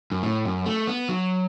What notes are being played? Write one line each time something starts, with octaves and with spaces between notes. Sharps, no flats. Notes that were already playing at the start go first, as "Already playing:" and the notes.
F#2
A2
F#2
A3
B3
F#3